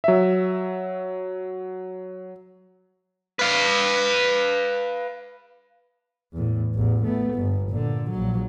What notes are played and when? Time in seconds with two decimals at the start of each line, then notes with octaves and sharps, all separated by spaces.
0.04 F#3 E5
3.39 B4 F5
6.33 E2 A2
6.75 A1 E2
7.04 A3 B3
7.34 G1
7.70 A#2 D3
8.10 A#1 F#3